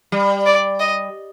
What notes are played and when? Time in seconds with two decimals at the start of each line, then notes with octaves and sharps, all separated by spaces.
0.12 G3
0.46 D5
0.80 D#5